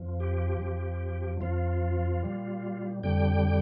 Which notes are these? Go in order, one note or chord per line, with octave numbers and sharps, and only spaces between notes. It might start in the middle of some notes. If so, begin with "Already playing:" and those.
Already playing: F2 F3
G4
F2 F3
F2 F3 F4
A#2 G3
F2 D3 G3 G5